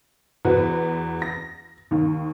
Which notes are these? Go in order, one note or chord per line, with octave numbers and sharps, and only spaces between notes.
E2 F#4 B4
A#6
D#2 D#3